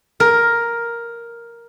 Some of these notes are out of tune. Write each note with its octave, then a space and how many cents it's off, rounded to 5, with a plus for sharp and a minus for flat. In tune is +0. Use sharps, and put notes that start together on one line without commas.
A#4 +5